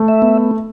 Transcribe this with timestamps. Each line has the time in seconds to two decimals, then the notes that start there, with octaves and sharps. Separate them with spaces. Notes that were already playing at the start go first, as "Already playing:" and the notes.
Already playing: A3
0.08 E5
0.22 B3